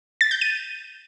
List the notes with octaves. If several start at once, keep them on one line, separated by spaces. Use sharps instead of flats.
A6
G6
D#7